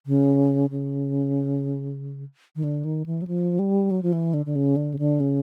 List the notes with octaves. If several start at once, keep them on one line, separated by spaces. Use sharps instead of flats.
C#3
C#3
D#3
D3
D#3
E3
F#3
F3
G3
F#3
F3
E3
D3
D3
C#3
D3
C#3
D3
C#3